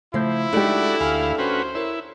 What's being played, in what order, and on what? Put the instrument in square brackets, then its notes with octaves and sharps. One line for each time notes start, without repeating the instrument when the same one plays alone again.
[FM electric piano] C#3 A3 G6 [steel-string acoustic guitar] F3 [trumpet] E4
[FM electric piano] G#3 D#4 [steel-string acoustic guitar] A3 D4 G4 [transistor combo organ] F#4 D5
[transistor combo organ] D2 F5 [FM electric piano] G#5 B5 F6
[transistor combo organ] C#4 F#4 B4 [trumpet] C5
[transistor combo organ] E4 [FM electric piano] A#4 C#5